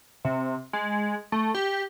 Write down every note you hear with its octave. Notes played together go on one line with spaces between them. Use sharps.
C3
G#3
A3
G4